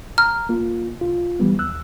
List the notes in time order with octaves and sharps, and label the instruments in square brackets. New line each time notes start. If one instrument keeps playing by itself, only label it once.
[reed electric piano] A#5 [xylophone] F6
[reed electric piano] A#3 F4
C2 F4
E3 G3 B3
D#2 E6 F#6